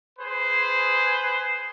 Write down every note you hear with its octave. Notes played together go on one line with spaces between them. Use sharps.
G#4 B4 C5